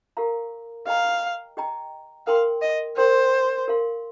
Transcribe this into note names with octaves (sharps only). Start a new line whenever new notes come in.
G4 A#4 F5 A#5
G4 D#5 F5 G5 A#5
G4 D#5 G5 A#5
A#4 F5 G5 C6
D#5
A#4 C5 G5 C6
G4 A#4 F5 C6